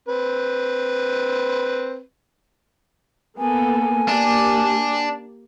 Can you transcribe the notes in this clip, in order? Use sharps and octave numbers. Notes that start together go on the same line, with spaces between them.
C4 B4
A#3 B3 A4 G#5
A#3 D4 G4